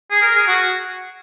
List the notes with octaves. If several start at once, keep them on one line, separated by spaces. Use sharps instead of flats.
G#4
A#4
G#4
F#4